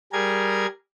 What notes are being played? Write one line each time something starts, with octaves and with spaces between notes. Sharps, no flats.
G3 G#4 A#4 G#6